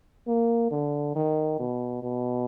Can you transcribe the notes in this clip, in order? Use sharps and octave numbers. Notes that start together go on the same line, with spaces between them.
A#3
D3
D#3
B2
B2